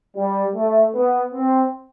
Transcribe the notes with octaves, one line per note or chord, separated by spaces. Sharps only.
G3
A3
B3
C4